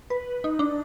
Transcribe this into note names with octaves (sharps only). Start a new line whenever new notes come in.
B4
D#4
D4